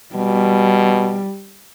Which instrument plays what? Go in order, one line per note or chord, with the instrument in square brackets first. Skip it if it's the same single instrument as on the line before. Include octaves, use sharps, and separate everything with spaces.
[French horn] B2 [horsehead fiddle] G3